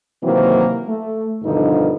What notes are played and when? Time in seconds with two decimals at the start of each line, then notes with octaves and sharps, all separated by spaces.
0.23 C3 D#3 E3 F#3 A#3 C4
0.87 A3
1.43 G2 B2 D3 D#3 F3 D#4